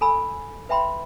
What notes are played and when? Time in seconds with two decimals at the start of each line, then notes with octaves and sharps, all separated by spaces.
0.01 A4 G#5 B5 E6
0.69 B4 E5 G5 B5 C6